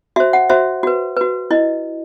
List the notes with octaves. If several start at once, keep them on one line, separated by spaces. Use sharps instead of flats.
F#4 C5 E5
F#5
F#4 C5 E5
F#4 B4
F#4 B4
E4 D#5